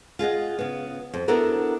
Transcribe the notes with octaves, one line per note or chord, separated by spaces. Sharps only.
F4 G#4 D#5 F#5
C#3 B3
F2
B3 D4 E4 F#4 A4 A#4